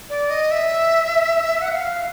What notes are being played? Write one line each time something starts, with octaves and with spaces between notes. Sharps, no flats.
D5
D#5
E5
F#5
F5